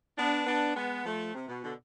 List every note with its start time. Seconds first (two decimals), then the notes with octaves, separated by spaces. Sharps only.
0.18 B3 D4
0.47 B3 D4
0.75 G#3 B3
1.05 F3 A3
1.35 C3
1.48 B2
1.63 B2 D3